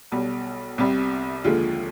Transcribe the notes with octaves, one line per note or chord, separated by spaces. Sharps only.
B1 B2 G3
C2 C3 G3
D#2 D3 F3 G#3 F4